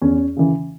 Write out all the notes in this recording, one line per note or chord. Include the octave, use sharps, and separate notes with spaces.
E2 C#4
C#3 E3